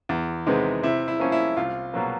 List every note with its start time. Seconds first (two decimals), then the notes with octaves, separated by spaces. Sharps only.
0.09 E2
0.46 C3 D#3 G#3 B3
0.83 C3 E4
1.08 E4
1.20 F3 A#3 C#4
1.32 E4
1.57 C2 F4
1.94 B2 F#3 A#3